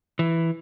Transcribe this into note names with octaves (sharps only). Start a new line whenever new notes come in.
E3